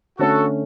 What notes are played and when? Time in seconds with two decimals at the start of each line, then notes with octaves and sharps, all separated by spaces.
0.19 D3 A3 C#4 F#4 A4